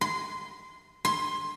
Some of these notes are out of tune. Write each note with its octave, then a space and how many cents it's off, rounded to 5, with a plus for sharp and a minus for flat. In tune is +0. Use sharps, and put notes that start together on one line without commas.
C6 -20
C6 +15